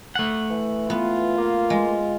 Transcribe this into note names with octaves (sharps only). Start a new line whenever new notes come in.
A3 F#5
E3
B3 F4
A#3
G#3